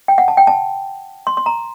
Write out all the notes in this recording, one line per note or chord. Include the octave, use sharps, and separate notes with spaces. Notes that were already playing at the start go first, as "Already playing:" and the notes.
G5
F#5
A5
G5
A5
C6
C6
A#5